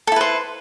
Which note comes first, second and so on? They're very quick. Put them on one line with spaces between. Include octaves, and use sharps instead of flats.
A4 E4 B4 C5